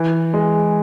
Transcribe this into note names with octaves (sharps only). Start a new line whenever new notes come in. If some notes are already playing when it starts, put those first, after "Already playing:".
Already playing: E3
G#3